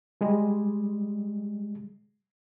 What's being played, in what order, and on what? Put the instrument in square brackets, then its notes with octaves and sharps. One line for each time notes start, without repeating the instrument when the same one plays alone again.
[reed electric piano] G3 G#3